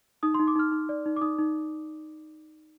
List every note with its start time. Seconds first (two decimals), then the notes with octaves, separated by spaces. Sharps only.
0.23 D#4 D#6
0.34 C6
0.39 D#4
0.47 D6
0.55 D#4 F6
0.72 D#4
0.89 D5
1.06 D#4
1.16 D6
1.21 D#4 D#6
1.39 D#4